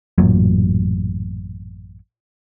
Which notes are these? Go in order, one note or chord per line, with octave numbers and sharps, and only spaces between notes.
A1 F#2 A#2 F#3